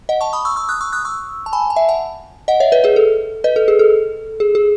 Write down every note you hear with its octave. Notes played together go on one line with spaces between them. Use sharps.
D#5 F#5
A5 C#6
B5 D#6
C#6 E6
C#6 E6
D#6 F#6
C#6 E6
D#6 F#6
C#6 E6
A5
G#5 B5
A5
E5 G#5
F#5 A5
D#5 F#5
C#5 E5
B4 D#5
G#4 B4
A4
B4 D#5
A4
G#4
A4
G#4
G#4